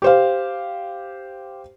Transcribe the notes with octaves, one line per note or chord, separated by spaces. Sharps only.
G4 C5 F5